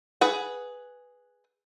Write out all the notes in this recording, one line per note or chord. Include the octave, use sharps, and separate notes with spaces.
G#4 B4 F#5